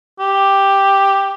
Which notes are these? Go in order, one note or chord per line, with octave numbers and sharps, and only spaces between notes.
G4